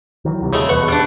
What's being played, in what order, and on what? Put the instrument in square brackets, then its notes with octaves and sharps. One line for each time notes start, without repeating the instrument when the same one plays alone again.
[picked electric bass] D#3 E3 F#3
D2 C3 G3
[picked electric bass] D#1 D#2 [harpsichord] C#3 G#3 A3
[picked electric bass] E2 B2 [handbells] B4 [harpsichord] F#5 C#6
[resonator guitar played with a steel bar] G3 D4